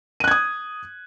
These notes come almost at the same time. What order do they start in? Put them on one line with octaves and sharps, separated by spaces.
D#7 F#6 G#6 D#6